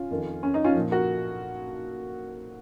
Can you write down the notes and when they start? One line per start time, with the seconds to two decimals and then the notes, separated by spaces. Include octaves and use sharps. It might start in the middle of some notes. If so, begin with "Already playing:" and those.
Already playing: C#4 F4
0.10 F2 D#3
0.43 C#4
0.54 D#4
0.64 C#4 F4
0.75 A#2 F3
0.91 F#4 A#4